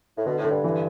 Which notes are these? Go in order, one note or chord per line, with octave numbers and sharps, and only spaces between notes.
A2
B2 D3
A2
D3
G2
E3